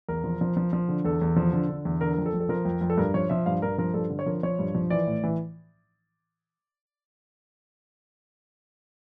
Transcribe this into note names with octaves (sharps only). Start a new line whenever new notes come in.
E2 A#4
F3
F3
F3
F3
D3
E2 A4
E2
F3
D3
D3
E2
D3 A#4
F2 A#4
A4
F2
A4
F3 A#4
F2
F2
A4
G2 A#4
F3 C#5
F3 E5
G2 F5
G2 A#4
F3 A#4
G2 A4
D3
C#5
F3 A#4
F3 C#5
G2
F3
E3 D5
A2
E3